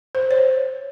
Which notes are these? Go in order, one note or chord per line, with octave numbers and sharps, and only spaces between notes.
C5
C#5